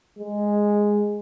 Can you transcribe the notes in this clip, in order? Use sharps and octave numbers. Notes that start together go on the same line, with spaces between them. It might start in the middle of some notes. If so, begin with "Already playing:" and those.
G#3